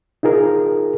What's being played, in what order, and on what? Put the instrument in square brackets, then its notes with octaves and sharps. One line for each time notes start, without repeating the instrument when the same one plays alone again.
[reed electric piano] D#4 F4 G#4 A#4